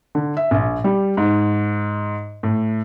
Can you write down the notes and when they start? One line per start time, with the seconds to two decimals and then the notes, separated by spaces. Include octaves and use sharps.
0.15 D3
0.37 E5
0.51 A#1
0.84 G3
1.17 G#2
2.43 A2